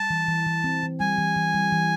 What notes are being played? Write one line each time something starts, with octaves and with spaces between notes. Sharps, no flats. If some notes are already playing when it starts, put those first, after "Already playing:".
Already playing: G3 A5
E3
E3
E3
C4
E3
G3 G#5
E3
E3
G3
E3